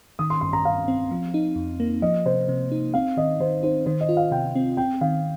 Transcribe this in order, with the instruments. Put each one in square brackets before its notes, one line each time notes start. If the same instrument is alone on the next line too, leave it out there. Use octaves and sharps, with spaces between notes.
[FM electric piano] D#3 [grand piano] D#6
[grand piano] C6
[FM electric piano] G2 [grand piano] C6
[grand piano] A#5
[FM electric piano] G2 [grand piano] F5
[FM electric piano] C4
F3
D#4
F2
A#3
[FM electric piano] F3 [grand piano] D#5
[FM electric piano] C3 [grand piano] C5
[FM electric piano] C3
D#4
[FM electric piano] C4 [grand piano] F5
[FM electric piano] D#3 [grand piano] D#5
[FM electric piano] D#3 [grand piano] C5
[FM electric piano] D#4 [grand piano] C5
[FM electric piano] D#3 [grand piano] C5
[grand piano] D#5
[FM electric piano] F4
[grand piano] F5
[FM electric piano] C3 [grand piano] G5
[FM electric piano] C4
[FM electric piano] C4 [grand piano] G5
[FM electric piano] D#3 [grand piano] F5